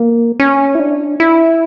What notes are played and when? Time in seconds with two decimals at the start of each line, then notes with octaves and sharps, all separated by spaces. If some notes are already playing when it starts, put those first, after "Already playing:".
Already playing: A#3
0.40 C#4
0.75 E4
0.80 D4
1.20 E4